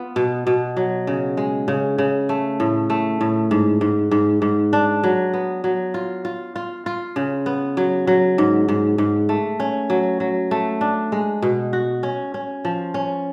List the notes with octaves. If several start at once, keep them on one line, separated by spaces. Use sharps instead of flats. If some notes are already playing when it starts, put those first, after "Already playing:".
Already playing: B3 F4
B2
B2
F#3
C#3
G#3
C#3
C#3
A3
A2
A3
A2
G#2
G#2
G#2
G#2
D4
F#3
B3
F#3
F4
F4
F4
F4
C#3
B3
F#3
F#3
G#2
G#2
G#2
A3
C#4
F#3
F#3
A3
D4
G#3
B2
F#4
C#4
C#4
F3
C#4